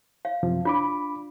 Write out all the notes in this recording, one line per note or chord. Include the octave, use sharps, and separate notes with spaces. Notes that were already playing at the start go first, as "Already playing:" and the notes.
F5
F#2 C3 F3
D4 F4 B5 D6